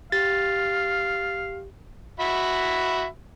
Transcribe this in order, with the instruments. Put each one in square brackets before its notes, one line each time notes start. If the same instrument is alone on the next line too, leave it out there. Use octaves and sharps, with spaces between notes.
[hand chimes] G4 [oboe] F5 [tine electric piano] A6
[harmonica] F#4 E5 B5